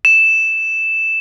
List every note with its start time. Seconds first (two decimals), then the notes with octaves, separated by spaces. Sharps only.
0.05 E7